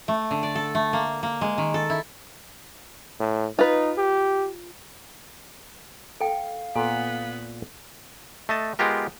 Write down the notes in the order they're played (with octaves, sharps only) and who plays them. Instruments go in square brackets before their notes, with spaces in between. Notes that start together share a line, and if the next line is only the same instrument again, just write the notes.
[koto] A3
D3
D5
A4
A3
A#3
A#3
G#3
D#3
A4
E4
[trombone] A2
[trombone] D#4 [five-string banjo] F4 B4
[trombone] G4
[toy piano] A4 G5 [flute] F5
[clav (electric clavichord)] A#2 F#5 [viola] B3 B5 [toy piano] A4
[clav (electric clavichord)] A3 D#5 A5
G#3 B3 F4 G4 A#4